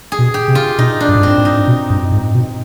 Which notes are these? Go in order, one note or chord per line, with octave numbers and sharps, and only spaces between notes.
G#4
B2
G4
C3
F4
B2 D#4
D4
G2
G#2
G2 C4
G#2
D#4
B2
G2
G#2
B2